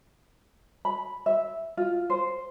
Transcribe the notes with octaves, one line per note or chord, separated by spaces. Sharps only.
B5
E5
F4
C5